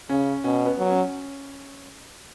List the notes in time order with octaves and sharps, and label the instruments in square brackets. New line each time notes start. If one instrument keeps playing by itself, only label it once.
[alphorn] C#3 [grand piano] C#4
[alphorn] B2 [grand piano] C#4
[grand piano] B3
[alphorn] F#3
[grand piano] C#4